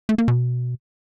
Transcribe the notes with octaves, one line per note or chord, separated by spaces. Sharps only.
A3
A#3
B2